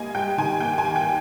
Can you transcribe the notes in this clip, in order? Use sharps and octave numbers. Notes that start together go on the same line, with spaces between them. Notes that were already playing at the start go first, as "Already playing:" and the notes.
Already playing: G3 A#3 D#5 G#5
G3 G5
D#3 G#5
A#3 G5
G#5
D#2
G5